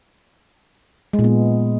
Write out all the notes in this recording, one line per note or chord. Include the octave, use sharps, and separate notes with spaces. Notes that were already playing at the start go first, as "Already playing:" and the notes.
G#3
A#2
B3